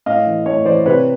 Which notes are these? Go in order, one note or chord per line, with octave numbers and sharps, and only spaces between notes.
A2 D#5 F5
E3
A2 C#5 D#5
E3 C5 D5
C3 B4 C#5